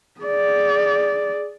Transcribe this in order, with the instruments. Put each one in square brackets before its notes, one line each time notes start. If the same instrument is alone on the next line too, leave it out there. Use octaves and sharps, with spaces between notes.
[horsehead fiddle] G#4 D5